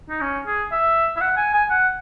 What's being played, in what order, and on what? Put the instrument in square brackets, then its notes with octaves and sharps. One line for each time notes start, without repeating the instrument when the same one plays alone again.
[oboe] D#4
C#4
G#4
E5
E5
F#5
G#5
G#5
F#5